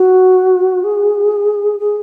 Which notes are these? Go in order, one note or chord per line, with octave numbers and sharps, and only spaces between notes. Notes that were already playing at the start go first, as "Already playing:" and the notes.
Already playing: F#4
G#4
G#4